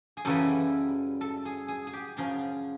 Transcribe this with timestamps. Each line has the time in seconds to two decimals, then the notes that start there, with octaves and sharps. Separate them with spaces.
0.17 G#4
0.25 F#2 C#3 E3 G3 A4
1.21 A4
1.45 G#4
1.68 G#4
1.87 G#4
1.93 G4
2.17 F#2 C#3 F3 G#4